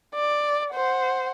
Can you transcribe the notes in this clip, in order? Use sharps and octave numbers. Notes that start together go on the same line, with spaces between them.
D5
C5 F#5